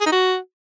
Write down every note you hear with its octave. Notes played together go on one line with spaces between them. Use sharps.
G#4
D#4
F#4